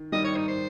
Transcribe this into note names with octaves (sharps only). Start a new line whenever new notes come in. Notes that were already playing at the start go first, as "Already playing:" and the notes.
Already playing: D#3
D#3 G3 D#5
C#5
D#4
C5